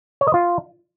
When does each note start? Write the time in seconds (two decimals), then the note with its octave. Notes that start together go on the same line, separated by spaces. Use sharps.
0.21 C#5
0.27 D#5
0.34 F4